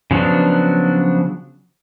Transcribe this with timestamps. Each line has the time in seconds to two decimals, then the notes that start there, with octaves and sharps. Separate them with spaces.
0.11 C#3 F3 F#3 B3 D4